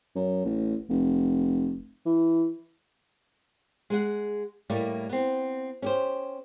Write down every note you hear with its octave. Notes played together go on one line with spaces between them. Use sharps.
F#2
A1
F1
E3
G#3 G#4 F#5
A2 G3 A3 A#3 D5
B3 C4
C#4 G4 C5